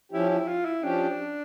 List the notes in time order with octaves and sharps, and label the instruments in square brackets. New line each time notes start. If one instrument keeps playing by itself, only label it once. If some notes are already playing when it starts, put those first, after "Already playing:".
[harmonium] F3 C#4 G4 [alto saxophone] E4
[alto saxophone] E4
F4
E4
[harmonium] F3 C#4 G4 [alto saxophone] D4